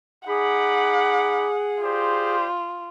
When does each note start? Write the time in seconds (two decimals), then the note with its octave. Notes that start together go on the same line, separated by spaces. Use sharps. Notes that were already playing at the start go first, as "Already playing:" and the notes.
0.28 D#4 G#4 F#5 B5 D6
1.82 F4 G4 C5 D5